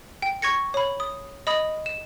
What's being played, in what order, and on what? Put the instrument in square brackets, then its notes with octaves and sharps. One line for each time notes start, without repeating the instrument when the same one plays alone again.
[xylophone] G5
C#6 G#6 A#6 C#7
C#5 B5
D#6
D#5 B5 D#6
E7